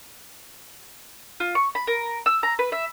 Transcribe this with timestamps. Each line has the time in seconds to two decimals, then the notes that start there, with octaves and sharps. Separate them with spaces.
1.40 F4
1.55 C#6
1.75 B5
1.87 A#4
2.26 E6
2.43 A#5
2.59 B4
2.72 E5